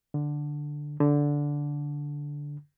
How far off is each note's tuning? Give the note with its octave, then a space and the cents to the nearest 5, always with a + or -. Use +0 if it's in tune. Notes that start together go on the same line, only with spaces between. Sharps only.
D3 +5
D3 -10